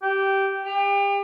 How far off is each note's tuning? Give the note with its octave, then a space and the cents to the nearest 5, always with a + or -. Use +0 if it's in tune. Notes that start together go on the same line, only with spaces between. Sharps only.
G4 -10
G4 +35